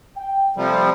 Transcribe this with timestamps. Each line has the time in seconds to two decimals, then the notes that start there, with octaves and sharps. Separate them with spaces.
0.16 G5
0.56 C3 F3 G3 A3 A4